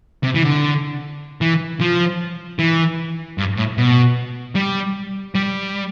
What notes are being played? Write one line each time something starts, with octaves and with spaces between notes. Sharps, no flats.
C3
E3
D3
E3
F3
E3
G2
A2
B2
G3
G3